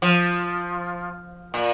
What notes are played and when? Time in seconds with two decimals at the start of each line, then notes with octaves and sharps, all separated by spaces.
0.02 F3
1.54 A#2